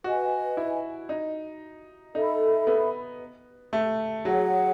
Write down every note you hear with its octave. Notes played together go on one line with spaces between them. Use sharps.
F#4 B4 D#5 G#5
E4
D#4
D#4 A4 E5 B5
B3
A3
F#3 G#4 C#5 F#5